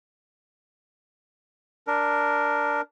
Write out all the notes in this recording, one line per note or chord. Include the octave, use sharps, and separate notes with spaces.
D4 A#4